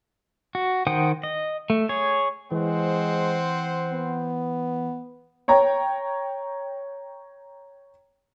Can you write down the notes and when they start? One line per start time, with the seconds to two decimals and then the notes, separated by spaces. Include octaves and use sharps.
0.55 F#4
0.87 D#3 C5 F#5 G5 D#6
1.23 D#5
1.70 A3
1.89 G#4 C#5
2.52 E3 G#3 C4 C5 F#5
3.91 B3
5.48 C#5 G5 A#5